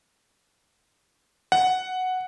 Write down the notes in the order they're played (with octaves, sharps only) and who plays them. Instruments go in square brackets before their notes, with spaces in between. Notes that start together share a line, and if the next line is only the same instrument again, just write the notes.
[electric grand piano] F#5